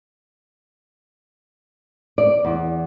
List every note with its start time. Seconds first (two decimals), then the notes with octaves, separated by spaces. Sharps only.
2.18 D5
2.45 E2